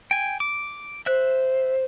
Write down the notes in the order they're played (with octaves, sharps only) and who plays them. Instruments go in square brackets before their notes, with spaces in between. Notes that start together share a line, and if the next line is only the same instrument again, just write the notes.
[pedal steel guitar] G5 G#5
D6
[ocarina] C5 [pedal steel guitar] E5 F#6